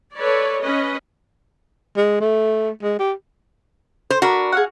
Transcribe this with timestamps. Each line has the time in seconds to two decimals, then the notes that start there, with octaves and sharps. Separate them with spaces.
0.16 A4 B4 C#5 D5
0.61 C#4 B4 D#5
1.97 G#3
2.21 A3
2.83 G#3
2.99 G4
4.10 C5
4.22 D4 F#4 A#4 B5
4.52 G#4 F5 F#5